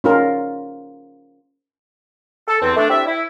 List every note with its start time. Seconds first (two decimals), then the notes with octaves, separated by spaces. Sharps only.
0.04 C#4 F4 A#4
2.48 A4
2.61 E2 C4
2.77 A3 D4
2.90 C4 D4 E4 G4 E5
3.06 E4